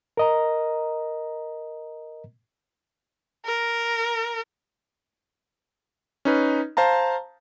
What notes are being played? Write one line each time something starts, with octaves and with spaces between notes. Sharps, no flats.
A#4 D#5 A#5
A#4
C#4 D#4 B4
C5 F5 A5 A#5